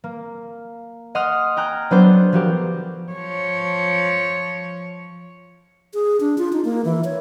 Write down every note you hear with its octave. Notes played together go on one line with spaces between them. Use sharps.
A#3
D#5 F#5 C6 D#6 F6
G5 G#5 A#5 F6 F#6
F#3 B3 D4 A4 C5
F3 F#4 G4 A#4
F3 C#5
G#4
D4
F4
D#4
A#3
E3
C#5